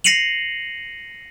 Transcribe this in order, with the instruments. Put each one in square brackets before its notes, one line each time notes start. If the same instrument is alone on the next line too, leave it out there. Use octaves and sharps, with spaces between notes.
[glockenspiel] A#6 C7 C#7 D#7 F7 F#7